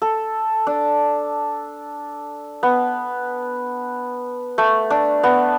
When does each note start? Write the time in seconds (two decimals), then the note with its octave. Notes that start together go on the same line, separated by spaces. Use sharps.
0.02 A4
0.67 D4
2.63 B3
4.58 A3
4.90 D4
5.23 B3